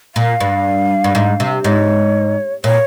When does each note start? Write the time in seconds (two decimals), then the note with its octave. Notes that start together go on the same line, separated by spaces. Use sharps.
0.15 A#2 F5
0.40 G2
1.04 G2
1.15 G#2
1.40 C3
1.64 G#2 C#5
2.64 A#2 C#5